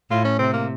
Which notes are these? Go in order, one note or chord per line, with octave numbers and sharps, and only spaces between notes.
A2 F4
C#4
C3 C4
A#3